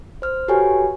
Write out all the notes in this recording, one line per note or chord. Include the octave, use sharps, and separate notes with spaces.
C5 F6
F#4 G4 A4 B4 C#5 G#5